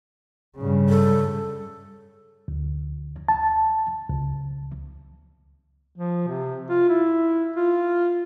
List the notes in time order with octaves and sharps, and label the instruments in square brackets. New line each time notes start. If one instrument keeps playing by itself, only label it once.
[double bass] G2 C#3
[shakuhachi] A4
[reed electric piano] D2
A5
C#2
[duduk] F3
C3
F4
E4
F4